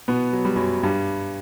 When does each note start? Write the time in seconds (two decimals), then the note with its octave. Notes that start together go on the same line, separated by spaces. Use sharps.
0.08 B2 B3
0.33 F#3
0.45 G3
0.56 F#2 F#3
0.83 G2 G3